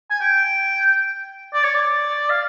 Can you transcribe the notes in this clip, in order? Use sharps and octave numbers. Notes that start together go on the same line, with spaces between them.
G#5
G5
D5
C#5
D5
F5